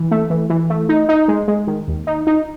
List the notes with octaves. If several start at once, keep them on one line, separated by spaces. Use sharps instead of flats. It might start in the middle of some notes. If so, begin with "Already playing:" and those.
Already playing: E3
A3
E3
E3
A3
D#4
D#4
G#3
G#3
D#3
D#2
D#4
D#4